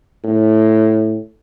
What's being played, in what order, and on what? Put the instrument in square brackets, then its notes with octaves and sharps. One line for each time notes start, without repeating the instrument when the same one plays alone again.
[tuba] A2